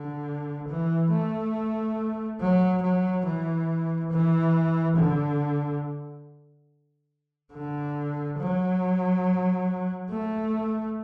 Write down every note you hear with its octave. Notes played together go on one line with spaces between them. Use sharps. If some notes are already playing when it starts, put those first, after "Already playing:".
Already playing: D3
E3
A3
F#3
F#3
E3
E3
D3
D3
F#3
A3